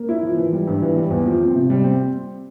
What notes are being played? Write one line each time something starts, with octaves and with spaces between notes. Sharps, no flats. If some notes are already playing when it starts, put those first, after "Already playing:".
Already playing: A#3
E4
F3
E3
G3
G2
E3
G3
E2
F3
C4
C3
G3
C4